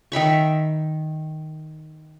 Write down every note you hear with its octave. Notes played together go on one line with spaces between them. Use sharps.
D#3 E5 B5 C#6